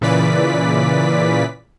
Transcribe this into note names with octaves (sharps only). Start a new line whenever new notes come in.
A#2 C#3 E3 B4 D5 B6